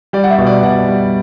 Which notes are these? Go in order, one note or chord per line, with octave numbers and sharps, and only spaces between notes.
G3 D5
F#5
E5
B2
D5
B2 F#5
G3